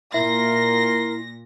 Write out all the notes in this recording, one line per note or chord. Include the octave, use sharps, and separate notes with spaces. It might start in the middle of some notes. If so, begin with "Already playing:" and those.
A#2 E4 A#4 C6 A#6